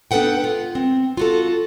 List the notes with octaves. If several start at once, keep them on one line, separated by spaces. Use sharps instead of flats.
B3 D4 A4 B4 F#5 G5
F4
C4
F4 F#4 A4